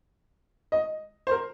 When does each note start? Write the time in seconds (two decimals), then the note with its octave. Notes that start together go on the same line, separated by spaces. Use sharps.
0.72 D#5
1.27 C5
1.31 A#4